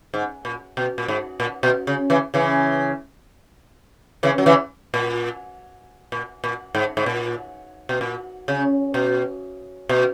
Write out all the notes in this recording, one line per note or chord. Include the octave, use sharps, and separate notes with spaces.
G#2
A#2
B2
A#2
G#2
A#2
B2
C#3
C#3 E3
C#3 E3
C#3 E3
F#3
C#3 E3
A#2
A#2
A#2
G#2
G#2
A#2
B2
A#2
C#3
B2
B2